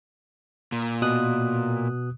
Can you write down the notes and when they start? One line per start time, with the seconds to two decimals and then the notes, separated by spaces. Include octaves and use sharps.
0.72 A#2
1.02 B2 D#6 F#6